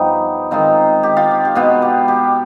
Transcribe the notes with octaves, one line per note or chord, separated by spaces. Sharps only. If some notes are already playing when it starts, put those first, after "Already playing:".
Already playing: G2 F3 B3 D#4 G4
D#3 G#3 C4 D#4 F4
G4
F4
G4
G4
B2 G#3 B3 F4
G4
G4